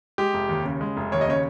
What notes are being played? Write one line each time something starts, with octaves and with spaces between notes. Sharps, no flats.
G#3 G4
F1
D#2
C#3
G#3
F1
D#2 C#5
D#5
C#3 C#5